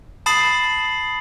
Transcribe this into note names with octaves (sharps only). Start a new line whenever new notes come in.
A5 B5 D#6 A6 C7 F#7